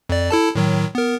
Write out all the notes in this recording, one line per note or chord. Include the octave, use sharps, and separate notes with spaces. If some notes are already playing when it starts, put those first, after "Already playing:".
F2 D5
E4 A4 A5
A2 D#3 F#3
B3 A#4